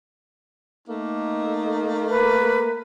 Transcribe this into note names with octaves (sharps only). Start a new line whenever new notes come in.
A3 A#3 D#4
A#4 B4